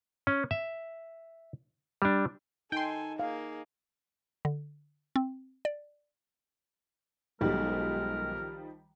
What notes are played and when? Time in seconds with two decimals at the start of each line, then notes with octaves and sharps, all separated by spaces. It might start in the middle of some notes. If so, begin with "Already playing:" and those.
0.27 C#4
0.51 E5
2.02 G3 D4
2.72 D#4 A4 G5 G#5 C6
3.19 A#3 G#4 F5
4.45 D3
5.16 C4
5.65 D5
7.41 B1 D#3 F3 G3 G#3 A#4